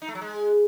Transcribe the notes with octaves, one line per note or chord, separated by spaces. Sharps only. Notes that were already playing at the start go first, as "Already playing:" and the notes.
D#4
A3
F#3
G#3